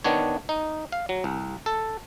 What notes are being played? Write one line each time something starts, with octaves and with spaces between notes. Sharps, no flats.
D#3 B3 D4 C#5
D#4
F5
F#3
C2
A4